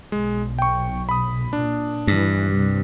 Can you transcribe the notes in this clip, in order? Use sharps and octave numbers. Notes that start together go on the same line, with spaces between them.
B1 G#3
G5 C#6
B5 D#6
A#2 D4
G2 E3
C2 C3 G3